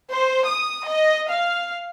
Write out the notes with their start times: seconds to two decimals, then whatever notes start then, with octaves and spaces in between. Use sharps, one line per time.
0.12 C5
0.47 D#6
0.86 D#5
1.30 F5